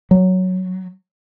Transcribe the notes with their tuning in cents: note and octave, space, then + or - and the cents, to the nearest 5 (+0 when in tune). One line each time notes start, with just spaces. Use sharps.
F#3 +0